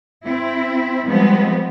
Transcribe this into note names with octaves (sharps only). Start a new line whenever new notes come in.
C4 E4
F3 G3 G#3 B3 C4